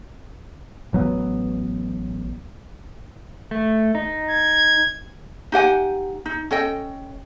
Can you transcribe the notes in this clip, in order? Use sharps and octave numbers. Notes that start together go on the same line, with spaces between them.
A1 F#3 A3 B3
A3
D#4
G#6
D#4 G4 F#5 G#5
D#4
C#4 A4 D#5 G5